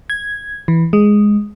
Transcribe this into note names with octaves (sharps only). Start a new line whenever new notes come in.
G#6
E3
G#3